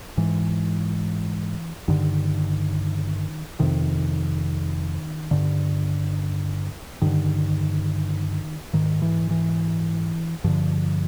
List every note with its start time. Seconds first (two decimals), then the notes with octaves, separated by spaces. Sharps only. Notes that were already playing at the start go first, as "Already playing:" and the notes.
0.17 G#2 E3
1.88 G2 D3 D#3
3.60 F2 C3 D#3
5.31 G2 D3
7.02 G2 D3 D#3
8.73 G#2 D#3
9.02 E3
9.30 E3
10.44 G2 D3 F3